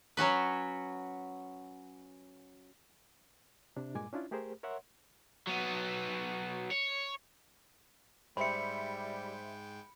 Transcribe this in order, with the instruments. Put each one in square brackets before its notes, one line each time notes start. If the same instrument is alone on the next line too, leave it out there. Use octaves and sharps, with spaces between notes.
[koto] F#3 C#4 F#4 B4
[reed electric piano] C3 D4
G2 A#2 G#3 G#5 D6
C#4 D4 E4 F4
A3 G4 G#4 A#4 C5
A#4 C#5 E5 F#5 C6
[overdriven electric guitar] F#3 B3
C#5
[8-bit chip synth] G#2 G#3 G5 [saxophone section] G3 [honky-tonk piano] C5 E5 [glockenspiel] B5 C#7